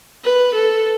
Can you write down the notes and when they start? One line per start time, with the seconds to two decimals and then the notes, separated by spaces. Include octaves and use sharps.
0.24 B4
0.55 A4